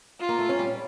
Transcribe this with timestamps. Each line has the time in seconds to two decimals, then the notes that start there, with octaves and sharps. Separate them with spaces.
0.20 F4
0.29 A#3
0.39 A3
0.49 C#4
0.59 G3